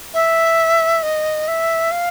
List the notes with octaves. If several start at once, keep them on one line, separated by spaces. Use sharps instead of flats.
E5
D#5
E5
F5